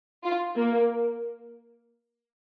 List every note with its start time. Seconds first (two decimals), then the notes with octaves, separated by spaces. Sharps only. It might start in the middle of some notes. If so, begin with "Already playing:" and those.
0.24 F4
0.56 A#3